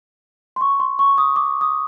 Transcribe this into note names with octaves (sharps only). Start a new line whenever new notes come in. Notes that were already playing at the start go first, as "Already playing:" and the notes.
C6
C#6
C6
C#6
D#6
D6
D#6